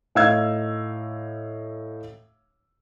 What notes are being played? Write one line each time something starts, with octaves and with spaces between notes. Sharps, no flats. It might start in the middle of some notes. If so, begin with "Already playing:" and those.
A2 D#4 F5 E6 G#6